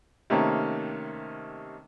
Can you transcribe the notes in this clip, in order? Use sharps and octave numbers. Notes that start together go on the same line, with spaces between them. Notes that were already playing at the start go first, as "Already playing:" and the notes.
C3 D#3 A3 A#3 C#4